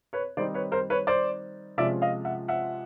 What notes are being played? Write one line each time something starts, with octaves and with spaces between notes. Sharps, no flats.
B4 C#5
D#3 G3 C4 D#4 C5 D5
B4 C#5
A#4 C5
B4 C#5
C5 D5
C3 F3 G#3 C#4 F4 D5 E5
D#5 F5
E5 F#5
E5 F#5